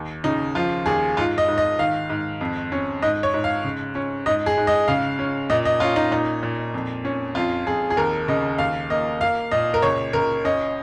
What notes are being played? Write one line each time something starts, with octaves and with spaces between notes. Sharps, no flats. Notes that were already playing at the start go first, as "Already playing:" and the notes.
Already playing: D#2
C#3 D#4
F3 F4
D#2 G#4
G#2 F4
D#5
G#2
D#5
D#3 F5
G#2
F2
C#4
G#2 D#5
C#5
G#2
F5
C#3
C#4
G#2 D#5
G#4
G#2
D#5
C#3 F5
C#4
A#2 D#5
D#5
C#4 F4
D#4
A#2 D#4
A#2
F2
C#4
F2 F4
F2 G#4
G#4
D#2 A#4
C#3 D#5
D#2 F5
A#3 D#5
A#3 F5
A#2 D#5
A#4
C#2 C#5
C#2 A#4
C#4 D#5